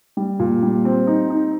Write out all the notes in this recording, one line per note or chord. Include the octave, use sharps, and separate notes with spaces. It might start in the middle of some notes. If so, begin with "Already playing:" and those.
G3
A#2
G3
C4
D#4
D#4